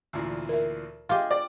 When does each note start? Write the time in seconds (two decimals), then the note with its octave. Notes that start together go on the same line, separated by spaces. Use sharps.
0.13 D2 A#2 E3
0.49 A#4 E5
1.09 F4 G4 G#4 D#5 F5
1.31 D5